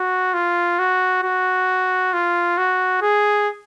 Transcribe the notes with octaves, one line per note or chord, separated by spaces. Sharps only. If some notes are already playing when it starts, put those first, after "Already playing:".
Already playing: F#4
F4
F#4
F#4
F4
F#4
G#4